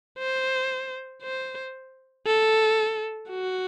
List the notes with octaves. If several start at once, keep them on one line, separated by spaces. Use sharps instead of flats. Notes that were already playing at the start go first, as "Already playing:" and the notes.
C5
C5
A4
F#4